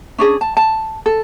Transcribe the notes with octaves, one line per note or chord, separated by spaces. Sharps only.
C#4 D4 G#4
A5
A5
A4